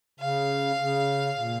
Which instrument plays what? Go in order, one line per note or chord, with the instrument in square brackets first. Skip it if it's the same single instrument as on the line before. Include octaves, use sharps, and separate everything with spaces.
[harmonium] C#3 [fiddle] F5
[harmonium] C#3
A#2